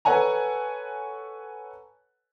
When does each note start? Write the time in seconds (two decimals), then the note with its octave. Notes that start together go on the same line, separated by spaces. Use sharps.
0.05 A4 B4 C#5 F#5 G#5 A#5